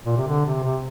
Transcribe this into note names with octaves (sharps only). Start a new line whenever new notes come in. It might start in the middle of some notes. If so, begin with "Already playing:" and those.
A#2
C3
D3
C3
C3